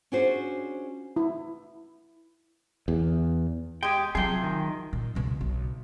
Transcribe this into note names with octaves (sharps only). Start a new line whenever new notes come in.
C#4 D4 F4 F#4 G#4 C5
E4
E2
G#3 G4 G5
C3 F3 F#3 G#4 G5
D#3
A#2
C#2 B2
B1